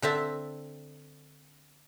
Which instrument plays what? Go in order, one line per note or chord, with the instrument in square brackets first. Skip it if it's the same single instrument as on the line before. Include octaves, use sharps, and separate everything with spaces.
[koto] D3 C4 E5 A5